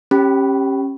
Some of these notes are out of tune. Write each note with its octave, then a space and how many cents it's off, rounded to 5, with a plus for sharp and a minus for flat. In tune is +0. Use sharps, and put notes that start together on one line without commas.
C#4 -25 G4 +0 B5 +0